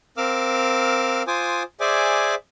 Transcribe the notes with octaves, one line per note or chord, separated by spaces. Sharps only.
C4 A#4 F5 D6 E6 F6
F4 C5 G#5 D6 D#6
G#4 C5 D5 E5 G#5 D6